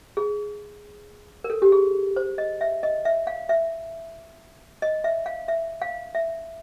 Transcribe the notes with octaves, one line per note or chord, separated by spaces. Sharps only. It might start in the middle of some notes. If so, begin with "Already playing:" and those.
G#4
A#4
A4
G4
G#4
C5
D#5
E5
D#5
E5
F5
E5
D#5
E5
F5
E5
F5
E5